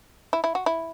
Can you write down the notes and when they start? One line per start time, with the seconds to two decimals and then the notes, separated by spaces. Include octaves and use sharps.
0.33 E4
0.44 E4
0.55 F#4
0.66 E4